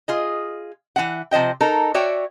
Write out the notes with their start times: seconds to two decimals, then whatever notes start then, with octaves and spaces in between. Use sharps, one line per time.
0.08 F4 G#4 D#5
0.96 E3 C4 E5 F#5
1.31 C3 F3 C5 D#5 G5
1.61 D#4 A4 A#4
1.94 F#4 C#5 D5 E5 G5